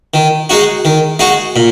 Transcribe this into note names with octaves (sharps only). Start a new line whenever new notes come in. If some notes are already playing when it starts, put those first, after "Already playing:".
D#3
G#3 D#4 F#4
D#3
G#3 D#4 F#4
A#2